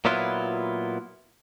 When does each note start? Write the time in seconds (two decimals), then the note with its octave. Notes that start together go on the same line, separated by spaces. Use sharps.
0.05 A#2 F#3 B3 E4 F4